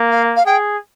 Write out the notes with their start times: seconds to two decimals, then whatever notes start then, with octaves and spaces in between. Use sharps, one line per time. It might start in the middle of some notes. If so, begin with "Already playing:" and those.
Already playing: A#3
0.11 F5
0.36 F5
0.46 G#4 G5